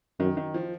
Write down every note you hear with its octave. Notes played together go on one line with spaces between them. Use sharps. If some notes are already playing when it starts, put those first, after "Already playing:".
F#2 D#3
D#3
F3